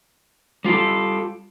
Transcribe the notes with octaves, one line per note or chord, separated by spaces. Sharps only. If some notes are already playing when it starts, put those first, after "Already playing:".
G3 F4 G4 A4